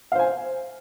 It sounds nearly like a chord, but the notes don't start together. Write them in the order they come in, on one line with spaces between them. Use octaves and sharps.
F5 C5 G#5